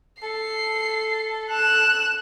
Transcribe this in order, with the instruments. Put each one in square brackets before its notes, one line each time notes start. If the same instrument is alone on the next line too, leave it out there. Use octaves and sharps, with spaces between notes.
[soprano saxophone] A4 [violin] C7
[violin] F#6 E7